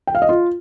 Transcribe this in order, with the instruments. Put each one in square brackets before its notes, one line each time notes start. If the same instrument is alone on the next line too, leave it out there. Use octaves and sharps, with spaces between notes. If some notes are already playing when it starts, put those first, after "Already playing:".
[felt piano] G5
F5
D#5
F4